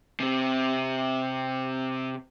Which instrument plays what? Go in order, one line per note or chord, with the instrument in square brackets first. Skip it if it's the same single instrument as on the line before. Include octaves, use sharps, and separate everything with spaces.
[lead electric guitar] C3 C4